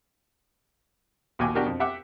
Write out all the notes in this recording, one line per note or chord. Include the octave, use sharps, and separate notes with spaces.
A#1 D#2 F#4 G5 G#5 D6
B2 D4 F#4 G4 A#4
F2
G4 E5 F#5 D6